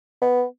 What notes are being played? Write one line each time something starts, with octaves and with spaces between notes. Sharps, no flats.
B3